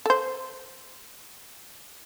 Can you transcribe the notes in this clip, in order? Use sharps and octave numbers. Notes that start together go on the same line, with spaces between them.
A4 C5